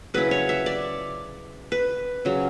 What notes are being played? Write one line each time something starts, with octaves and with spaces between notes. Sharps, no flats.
C#3 F#3 C#4 E4 B4
C#5
E5
D5
B4
C#3 F#3 C#4